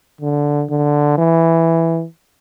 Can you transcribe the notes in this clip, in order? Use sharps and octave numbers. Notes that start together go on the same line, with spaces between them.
D3
D3
E3